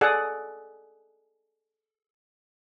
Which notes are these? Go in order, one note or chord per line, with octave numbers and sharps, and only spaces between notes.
G#4 A4 D5 F#5